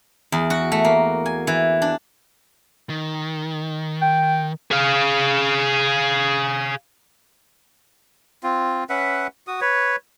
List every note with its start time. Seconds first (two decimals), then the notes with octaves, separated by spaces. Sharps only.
0.32 E2
0.50 F#4
0.72 A3
0.85 A#3
1.26 G#5
1.47 E3
1.82 D4
2.90 D#3
4.02 G5
4.71 G#4 F5
8.43 C4 F4
8.90 C#4 B4 E5 F#5
9.47 F#4 D#6
9.61 B4 C#5